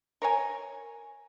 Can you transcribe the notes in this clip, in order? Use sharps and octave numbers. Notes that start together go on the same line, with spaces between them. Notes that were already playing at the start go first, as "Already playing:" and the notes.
A#4 C#5 G#5